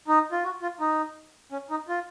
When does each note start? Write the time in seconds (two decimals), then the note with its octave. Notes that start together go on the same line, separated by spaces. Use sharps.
0.08 D#4
0.32 F4
0.44 F#4
0.62 F4
0.80 D#4
1.52 C#4
1.70 D#4
1.88 F4